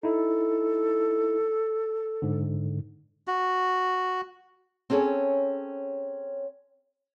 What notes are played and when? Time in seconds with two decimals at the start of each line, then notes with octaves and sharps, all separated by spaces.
0.03 D#4 E4 A4
2.22 G#2 D3
3.27 F#4
4.90 C4 C#4 G#4 A4 C#5